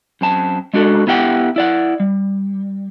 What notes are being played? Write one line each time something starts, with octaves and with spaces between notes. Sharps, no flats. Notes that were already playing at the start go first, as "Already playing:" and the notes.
F#2 C4 A5
G#3 D4 F#4 A4
B3 E4 G4 F#5 G5
E4 D5 F#5
G3